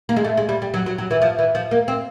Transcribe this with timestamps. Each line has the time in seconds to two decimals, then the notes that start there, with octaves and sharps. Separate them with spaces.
0.09 A#3
0.16 G#3
0.25 A3
0.37 G#3
0.49 G3
0.62 G3
0.74 F#3
0.86 F#3
0.98 F#3
1.11 E3
1.22 F3
1.39 E3
1.55 F3
1.71 A#3
1.88 C4